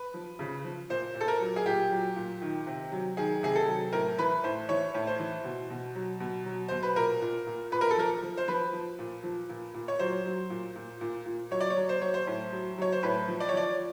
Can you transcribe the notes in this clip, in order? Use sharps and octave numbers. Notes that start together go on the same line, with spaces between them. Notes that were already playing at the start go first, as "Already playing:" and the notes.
Already playing: B4
F3
C#3
F3
A#2 C5
A#2
A4
A#4
F#3
G#4
A#2 G4
F#3
A#2
D#3
C3
F#3
D#3 G#4
C3 G#4
A4
F#3
A2 A#4
E3 B4
A2 C5
E3 C#5
A2
C5
E3
B2
B2
F#3
B2
F#3
B2 C5
B4
A#2 A#4
A#2
A#2
A#2 B4
A#4
A4
F3 A#4
F3
C5
F3 B4
F3
A#2
F3
A#2
A#2
C#5
F#3 C5
F#3
A#2
A#2
A#2
A#2
F#3 C#5
D5
C#5
F#3
C5
F#3 C#5
C5
A2
F#3
F#3 C#5
C5
A2 B4
F3
D5
C#5
F3 D5